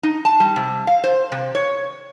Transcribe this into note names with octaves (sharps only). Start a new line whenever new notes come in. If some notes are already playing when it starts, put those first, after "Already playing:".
D#4
A5
G3
C3
F5
C5
C3
C#5